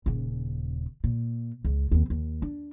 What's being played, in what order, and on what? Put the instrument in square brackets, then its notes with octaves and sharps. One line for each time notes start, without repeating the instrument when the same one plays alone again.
[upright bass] D#1 C#3
A#2
C#2
D#2 C4
D#2
D4